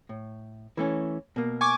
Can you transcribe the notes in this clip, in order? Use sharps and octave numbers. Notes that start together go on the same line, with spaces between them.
A2
E3 A3 C#4
B2 A#3
G#5 C#6 D6